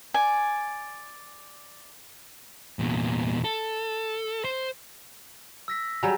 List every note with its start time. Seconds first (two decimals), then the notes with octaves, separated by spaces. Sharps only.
0.14 D5 G#5
2.79 E2 A#2
3.44 A4
4.45 C5
5.68 E6 A#6 B6
6.03 F#3 G3 G#5 A#5